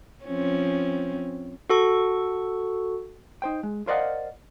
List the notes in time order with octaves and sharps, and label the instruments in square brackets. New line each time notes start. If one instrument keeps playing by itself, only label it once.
[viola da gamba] F3 C4 C#4
[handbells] F#4 A4 C#6
[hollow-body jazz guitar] D#4 C5 G5
G#3
A#4 C5 D5 D#5 F5 F#5